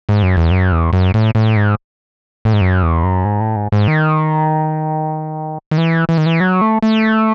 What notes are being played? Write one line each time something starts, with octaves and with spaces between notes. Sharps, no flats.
G#2
F#2
E2
F#2
E2
F#2
A2
A2
G#2
A2
G#2
F#2
E2
F#2
G#2
A2
G#2
G#2
D#3
D#3
E3
E3
D#3
E3
F#3
A3
A3